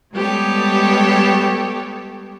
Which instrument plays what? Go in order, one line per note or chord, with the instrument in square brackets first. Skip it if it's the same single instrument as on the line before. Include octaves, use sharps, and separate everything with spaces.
[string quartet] G3 G#3 B3 G4 A4 C#5